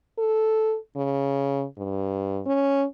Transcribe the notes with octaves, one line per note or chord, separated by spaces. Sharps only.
A4
C#3
G2
C#4